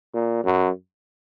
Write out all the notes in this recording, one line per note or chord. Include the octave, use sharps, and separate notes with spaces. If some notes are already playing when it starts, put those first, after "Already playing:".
A#2
F#2